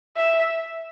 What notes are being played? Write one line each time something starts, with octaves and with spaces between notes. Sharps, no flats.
E5